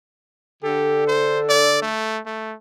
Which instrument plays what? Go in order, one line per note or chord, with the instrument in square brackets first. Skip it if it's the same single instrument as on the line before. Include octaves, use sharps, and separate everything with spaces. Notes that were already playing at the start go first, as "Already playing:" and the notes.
[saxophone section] D3 A4 [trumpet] G4
[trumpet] C5
D5
A3
A3